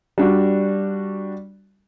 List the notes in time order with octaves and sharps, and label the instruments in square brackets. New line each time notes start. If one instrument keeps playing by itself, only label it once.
[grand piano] G3 D4 F#4